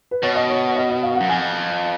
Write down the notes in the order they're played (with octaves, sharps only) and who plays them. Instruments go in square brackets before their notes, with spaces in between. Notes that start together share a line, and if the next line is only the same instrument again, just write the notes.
[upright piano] B4
[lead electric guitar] B2 [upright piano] C#5
[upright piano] D#5
C#5
D#5
D#5
F5
F#5
[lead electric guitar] F#2
[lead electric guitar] F2 [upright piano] G#5